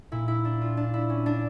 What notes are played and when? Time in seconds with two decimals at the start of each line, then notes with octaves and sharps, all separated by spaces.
0.12 A#2 E4
0.28 E4
0.45 D4
0.61 F4
0.77 D4
0.94 E4
1.10 C#4
1.26 D4